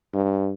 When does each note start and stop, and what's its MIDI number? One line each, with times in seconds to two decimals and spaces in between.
0.14 0.53 43